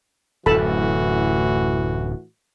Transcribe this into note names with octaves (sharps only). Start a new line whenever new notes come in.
D1 F#2 A2 E3 F#4 A4 A5 B5